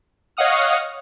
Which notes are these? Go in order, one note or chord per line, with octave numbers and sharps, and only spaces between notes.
C#5 D#5 F5 F#5 D#6 F6